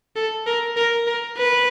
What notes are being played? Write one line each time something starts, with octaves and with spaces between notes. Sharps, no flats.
A4
A#4
A#4
A#4
B4